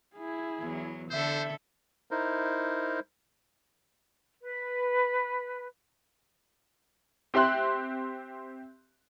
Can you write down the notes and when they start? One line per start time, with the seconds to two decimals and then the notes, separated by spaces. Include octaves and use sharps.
0.15 E4 G#4
0.60 E2 F#3
1.11 D3 A4 C5 E5
2.11 D#4 E4 A#4 C5
4.42 B4
7.34 C4 G4 E5 C6 F#6